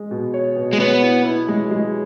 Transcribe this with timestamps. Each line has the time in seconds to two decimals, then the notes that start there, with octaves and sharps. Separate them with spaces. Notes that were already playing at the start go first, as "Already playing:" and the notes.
Already playing: G#3
0.11 B2
0.34 C#5
0.56 B2
0.73 G#3
0.80 B3 C#5
1.03 E4
1.25 E4
1.48 G#3
1.71 G#3